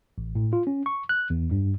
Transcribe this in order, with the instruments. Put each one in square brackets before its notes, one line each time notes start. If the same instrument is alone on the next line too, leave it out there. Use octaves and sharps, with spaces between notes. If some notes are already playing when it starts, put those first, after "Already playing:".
[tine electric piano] A1
A2
F4
C#4
C#6
F#6
E2
G2